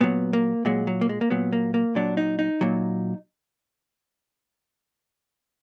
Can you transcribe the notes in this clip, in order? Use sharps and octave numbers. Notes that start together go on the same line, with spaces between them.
A#2 F#3 B3
A#3
A#2 F#3 G#3
F#3
A#3
G#3
A#3
A#2 F#3 B3
A#3
A#3
A#2 F#3 D4
D#4
D#4
A#2 F#3